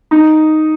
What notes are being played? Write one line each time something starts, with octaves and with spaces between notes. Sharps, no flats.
D#4